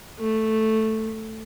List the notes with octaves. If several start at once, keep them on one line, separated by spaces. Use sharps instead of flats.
A3